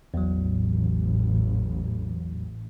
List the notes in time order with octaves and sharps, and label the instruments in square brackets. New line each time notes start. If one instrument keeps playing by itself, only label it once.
[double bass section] A1 [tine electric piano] E2 F#3